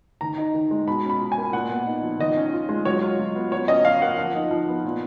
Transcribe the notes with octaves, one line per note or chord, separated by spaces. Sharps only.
D#3 A#5
D#4
D#3
G#3
B2 B5
C#4 B5
F4
G#5
A#3
A#2 F#5
B3
D#4
F3
D#3 D#5
C#4
F4
G#3
F#3 C#5
F4
F#3
B3
F#3 C#5
C#4 D#5
F4 F5
A#3 F#5
F3
D#4
F3
B3
A#2